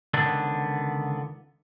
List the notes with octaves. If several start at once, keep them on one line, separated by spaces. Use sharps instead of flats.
C#2 D3 D#3 B3 D4